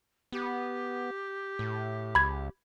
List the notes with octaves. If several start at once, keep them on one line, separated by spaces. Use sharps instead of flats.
B3 G4
A2
C#2 B5 G#6